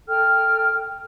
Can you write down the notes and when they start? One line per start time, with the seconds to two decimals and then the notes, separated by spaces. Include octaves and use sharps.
0.08 A4 G5 F6